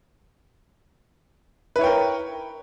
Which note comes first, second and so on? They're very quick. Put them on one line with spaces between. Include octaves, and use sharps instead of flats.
B4 E4 C#5 G5 A#4